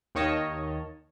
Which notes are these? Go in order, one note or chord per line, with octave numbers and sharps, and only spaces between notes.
D#2 D#3 C#5 D#5 A5